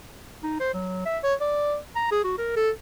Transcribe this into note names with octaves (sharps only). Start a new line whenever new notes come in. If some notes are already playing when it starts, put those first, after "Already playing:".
D#4
C5
F#3
E5
C#5
D5
A#5
G#4
F#4
A#4
A4